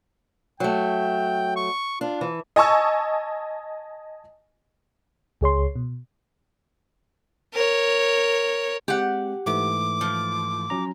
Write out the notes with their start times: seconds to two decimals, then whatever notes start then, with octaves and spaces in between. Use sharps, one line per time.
0.60 F#3 A3 G5
1.56 C#6
2.01 D4 F4
2.21 E3
2.56 D#5 G#5 A5 C#6 E6
5.41 C#2 G#4 C#5 C6
5.76 B2
7.54 A#4 C#5
8.88 G#3 C4 G4 F#5
9.46 G#2 E3 A3 D6
10.01 F3
10.70 F#3 C#4 A#5